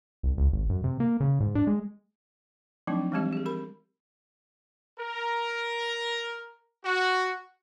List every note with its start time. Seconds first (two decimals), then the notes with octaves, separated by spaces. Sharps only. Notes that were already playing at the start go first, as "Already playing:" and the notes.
0.23 C2
0.38 C#2
0.52 G#1
0.70 F#2
0.84 C3
1.00 A#3
1.20 C#3
1.40 G#2
1.55 D4
1.67 G#3
2.87 F3 F#3 A3 C4 D4 D#4
3.12 E3 G3 G#3 C4 G4 D#5
3.33 G4 G#4
3.45 G4 A#4 B5
4.99 A#4
6.84 F#4